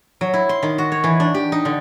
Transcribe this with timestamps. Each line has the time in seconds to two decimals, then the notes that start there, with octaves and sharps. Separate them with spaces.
0.21 F#3
0.34 E4
0.49 C6
0.63 D#3
0.78 F#4
0.92 C#5
1.04 E3
1.20 D4
1.34 G4
1.52 D#4
1.65 D3